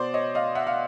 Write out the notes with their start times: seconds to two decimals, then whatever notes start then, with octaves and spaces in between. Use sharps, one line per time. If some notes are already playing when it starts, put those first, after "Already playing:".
Already playing: B2 C5 D5
0.14 C#5 D#5
0.35 D#5 F5
0.55 E5 F#5
0.67 F5